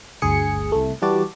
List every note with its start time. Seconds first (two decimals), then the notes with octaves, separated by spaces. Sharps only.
0.22 G1 D2 G#4 C#7
0.72 C2 A3
1.02 E3 G3 F#4 A5 D6